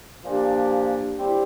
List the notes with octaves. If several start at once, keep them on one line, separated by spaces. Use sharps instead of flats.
A#2 F3 A#3 D4 G4
G3 C4 E4 G4